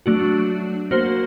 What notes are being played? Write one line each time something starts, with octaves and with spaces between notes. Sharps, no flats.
F#3 A3 D4 F#4
A#3 F#4 C5